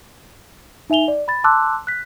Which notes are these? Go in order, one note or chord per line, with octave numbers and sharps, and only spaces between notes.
D#4 E5 G#5 F7 G7
D5
B5 A6
A5 C6 D6 E6 F#6
F#6 B6